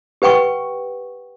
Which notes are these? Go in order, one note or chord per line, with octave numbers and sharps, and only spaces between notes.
G4 B4 F#5 G5 C#6